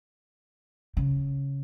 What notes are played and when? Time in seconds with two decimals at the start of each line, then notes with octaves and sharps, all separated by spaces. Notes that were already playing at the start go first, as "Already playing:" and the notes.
0.97 C#3